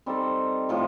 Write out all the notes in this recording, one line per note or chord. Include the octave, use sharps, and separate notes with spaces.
G3 C4 D#4 A4
A2 F3 A3